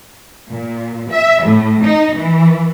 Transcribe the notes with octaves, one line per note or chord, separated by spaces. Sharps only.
A#2
E5
A2
D#4
E3